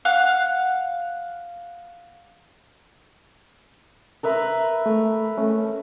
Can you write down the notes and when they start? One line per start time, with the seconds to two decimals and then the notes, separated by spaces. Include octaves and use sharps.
0.05 F5 F#5
4.23 A#4 B4 E5
4.86 A3
5.38 A3 C#4